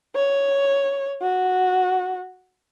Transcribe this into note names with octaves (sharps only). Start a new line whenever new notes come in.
C#5
F#4